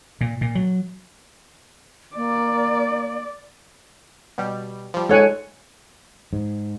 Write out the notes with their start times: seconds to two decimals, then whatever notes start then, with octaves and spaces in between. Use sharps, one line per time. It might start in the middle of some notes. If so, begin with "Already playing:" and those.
0.21 A#2
0.41 A#2
0.55 F#3
2.16 A#3 D5
4.38 B2 G3
4.94 F3 G3
5.09 G#3 A4 C#5 F#5 G#5
6.33 G#2